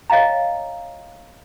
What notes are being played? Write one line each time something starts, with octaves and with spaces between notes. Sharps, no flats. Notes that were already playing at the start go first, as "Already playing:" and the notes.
C#5 D#5 F5 G5 A#5